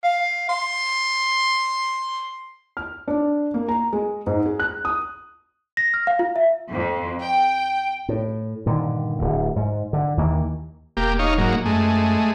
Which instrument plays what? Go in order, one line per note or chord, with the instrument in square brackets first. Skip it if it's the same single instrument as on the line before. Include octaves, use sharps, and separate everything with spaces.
[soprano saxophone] F5
C6
[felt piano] F6
D4
A#3
A#5
G#3
G#2
G#4
F#6
D#6
[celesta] A#6
F6
F5
F4
E5
[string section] F2
G5
[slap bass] A2
G2 A#2 D3 D#3
D1 D2
G#2
D3
D#2 D#3 E3 A#3
[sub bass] E1 [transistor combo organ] A#3 G4
[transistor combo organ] D#4 C#5 F5
G#2 F#3 A#3
[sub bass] F#2 [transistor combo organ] G#3 A3